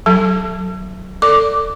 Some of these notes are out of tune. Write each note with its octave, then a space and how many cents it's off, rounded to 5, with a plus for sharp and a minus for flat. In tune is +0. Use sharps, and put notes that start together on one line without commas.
F#3 +0 A4 +0 A5 +0
A4 +30 D5 -15 D6 +0